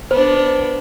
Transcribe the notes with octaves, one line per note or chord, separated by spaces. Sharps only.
B3 D4 C5